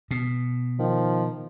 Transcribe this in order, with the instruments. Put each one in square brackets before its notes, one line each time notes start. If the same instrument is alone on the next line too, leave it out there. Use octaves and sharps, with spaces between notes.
[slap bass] B2
[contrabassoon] D#3 [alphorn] F3